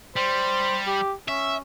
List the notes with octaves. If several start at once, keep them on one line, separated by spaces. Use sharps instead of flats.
G3 C5
G4
C#4 E5